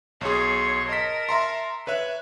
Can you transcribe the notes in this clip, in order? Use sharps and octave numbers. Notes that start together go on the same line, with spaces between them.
B1 G#4 C#5 C6
A#4 D#5 A5 B6
E5 A#5 C6
B4 C#5 E5 F#6